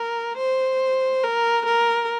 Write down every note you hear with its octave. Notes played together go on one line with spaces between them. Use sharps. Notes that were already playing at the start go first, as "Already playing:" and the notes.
Already playing: A#4
C5
A#4
A#4